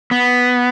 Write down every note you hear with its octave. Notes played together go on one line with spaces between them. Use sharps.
B3